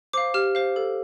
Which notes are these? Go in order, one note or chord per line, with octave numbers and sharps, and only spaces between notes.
C5 F5 D6
G4 F6
C5 F5
A4